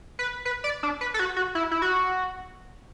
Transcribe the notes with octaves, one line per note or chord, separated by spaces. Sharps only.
B4
B4
D5
D4
B4
A4
F#4
F#4
E4
E4
F#4